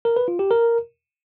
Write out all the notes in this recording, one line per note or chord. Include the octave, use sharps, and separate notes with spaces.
A#4
B4
F4
G4
A#4